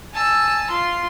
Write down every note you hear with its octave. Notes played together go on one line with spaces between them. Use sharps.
G#5 A5 E6
F4 C6